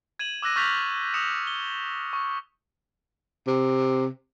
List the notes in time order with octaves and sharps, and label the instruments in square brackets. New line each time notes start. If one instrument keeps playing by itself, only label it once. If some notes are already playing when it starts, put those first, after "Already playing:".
[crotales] G#6 D#7 E7 F#7
D6 E6 F#6 A#6 D#7
C#6 F6 G6 A6 B6 F7
D#6 A#6 C#7 E7 F7
G7
C#6
[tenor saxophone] C3